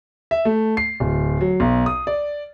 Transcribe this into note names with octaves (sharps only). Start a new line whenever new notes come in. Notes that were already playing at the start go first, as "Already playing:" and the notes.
E5
A3
C7
D1
F#3
B1
D#6
D5